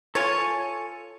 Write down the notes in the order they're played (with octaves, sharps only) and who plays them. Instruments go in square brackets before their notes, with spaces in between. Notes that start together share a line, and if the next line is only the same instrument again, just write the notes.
[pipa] F4 C#5 [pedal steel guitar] A4 G#5 C#6